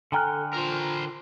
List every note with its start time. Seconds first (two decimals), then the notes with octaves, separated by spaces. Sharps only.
0.12 D3 A4 G5 G#5 A#5 F6 F#6
0.54 F4 A#4 C5